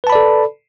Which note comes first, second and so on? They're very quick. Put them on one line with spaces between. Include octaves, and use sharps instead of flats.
B4 A5 B5 D5 A4